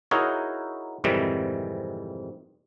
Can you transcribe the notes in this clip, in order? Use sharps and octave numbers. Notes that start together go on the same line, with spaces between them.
D#4 E4 F#4 G#4 A#4 C#5
F2 G#2 C3 D#3 E3 G3